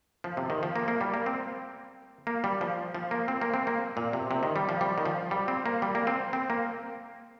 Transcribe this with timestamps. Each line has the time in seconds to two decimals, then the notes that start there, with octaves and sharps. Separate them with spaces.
0.24 F3
0.37 C3
0.50 D#3
0.63 F3
0.76 A#3
0.88 A#3
1.01 G3
1.14 A#3
1.26 C4
2.27 A#3
2.44 G3
2.61 F3
2.95 F3
3.11 A#3
3.28 C4
3.41 A#3
3.54 C4
3.67 A#3
3.97 A#2
4.13 C3
4.31 C3
4.43 D#3
4.56 G3
4.69 F3
4.81 G3
4.98 D#3
5.06 F3
5.31 G3
5.48 C4
5.66 A#3
5.82 G3
5.95 A#3
6.07 C4
6.33 C4
6.50 A#3